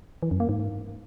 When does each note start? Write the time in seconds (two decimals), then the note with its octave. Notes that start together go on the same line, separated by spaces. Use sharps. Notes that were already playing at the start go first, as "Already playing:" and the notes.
0.23 E3
0.31 F#2
0.40 A#3
0.49 G#2